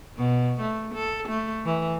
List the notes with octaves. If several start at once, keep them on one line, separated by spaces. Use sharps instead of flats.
B2
A3
A4
A3
E3